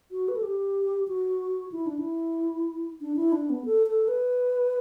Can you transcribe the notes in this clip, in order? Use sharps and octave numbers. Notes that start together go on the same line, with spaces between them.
F#4
B4
A4
G4
F#4
E4
D4
E4
D4
E4
D4
B3
A4
A4
B4